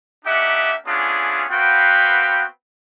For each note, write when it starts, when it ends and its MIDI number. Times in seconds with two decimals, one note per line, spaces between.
0.25 0.74 58
0.25 0.74 62
0.25 0.74 63
0.25 0.74 67
0.25 0.74 76
0.25 0.74 78
0.86 1.43 57
0.86 1.43 59
0.86 1.43 61
0.86 1.43 62
0.86 1.43 65
0.86 1.43 68
1.50 2.44 59
1.50 2.44 60
1.50 2.44 66
1.50 2.44 71
1.50 2.44 77
1.50 2.44 79